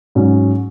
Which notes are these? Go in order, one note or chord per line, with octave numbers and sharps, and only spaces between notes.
G#2 F#3 C#4 F#4